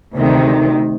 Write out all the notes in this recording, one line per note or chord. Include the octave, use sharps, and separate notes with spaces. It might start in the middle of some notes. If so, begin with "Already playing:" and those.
D2 C3 D#3